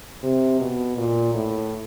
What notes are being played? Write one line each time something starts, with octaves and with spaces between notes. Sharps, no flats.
C3
B2
A#2
A2